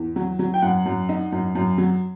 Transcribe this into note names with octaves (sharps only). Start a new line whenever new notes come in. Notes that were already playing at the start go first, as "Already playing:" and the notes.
Already playing: E2
F#3
F#3
G5
F#2 F#5
F#2
D#4
F#2
F#2
F#3